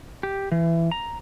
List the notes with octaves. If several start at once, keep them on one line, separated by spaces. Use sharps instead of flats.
G4
E3
A#5